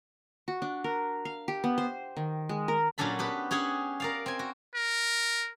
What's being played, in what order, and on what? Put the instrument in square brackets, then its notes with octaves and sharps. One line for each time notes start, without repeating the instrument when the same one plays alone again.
[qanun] F#4
D4
A#4
F5
G4
B3
C5
D#3
G#3
A#4
[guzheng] A#2 F#3 C#4 D4 A4 B5
B3 G4 B4
C#4 G4 G#4 F#5
A#4 D5 F5
C4 G#5
F#4
[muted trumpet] A#4